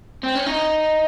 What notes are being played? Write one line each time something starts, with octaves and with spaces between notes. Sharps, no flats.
C4
C#4
D#4